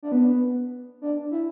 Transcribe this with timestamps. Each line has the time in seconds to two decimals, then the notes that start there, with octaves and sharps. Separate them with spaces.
0.03 D4
0.12 B3
1.02 D4
1.31 E4